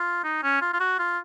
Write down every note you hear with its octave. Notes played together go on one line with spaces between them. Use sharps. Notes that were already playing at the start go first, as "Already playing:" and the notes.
Already playing: F4
D#4
C#4
F4
F4
F#4
F4